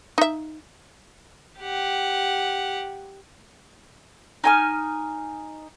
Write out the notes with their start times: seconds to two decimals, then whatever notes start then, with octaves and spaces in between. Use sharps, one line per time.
0.18 D#4 E5
1.60 G4 F#5
4.44 D#4 G#5 F6